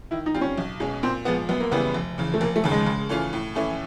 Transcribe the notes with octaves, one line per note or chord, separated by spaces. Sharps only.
D#3 E4
D#4
G3 C4 F4
C#4
B1
B2 G#3 C#4
A#2 C4
F3 G#3 B3
F#2 B3
A#3
C#3 E3 G3 B3
F1
E2 C#3
A3
F1 A#3
A3
D#2 C#3
G#3
C#3
E3 A3 C#4 F4
A2
E3 A3 C#4 E4